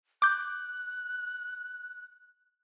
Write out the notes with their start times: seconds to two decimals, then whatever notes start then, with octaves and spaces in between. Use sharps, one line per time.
0.22 D6 F#6 G6